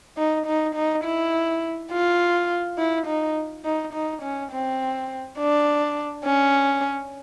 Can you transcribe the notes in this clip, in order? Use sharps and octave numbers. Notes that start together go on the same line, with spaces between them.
D#4
D#4
D#4
E4
F4
E4
D#4
D#4
D#4
C#4
C4
D4
C#4